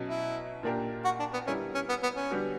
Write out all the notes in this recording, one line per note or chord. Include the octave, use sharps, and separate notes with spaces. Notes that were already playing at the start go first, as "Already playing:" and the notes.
Already playing: B2 F#3 C#4
E4
A#2 A#3 D4 G4 A#4
F#4
D4
B3
D3 G3 B3 C#4 E4 A#4
C#4
B3
B3
C#4
D3 G3 B3 F#4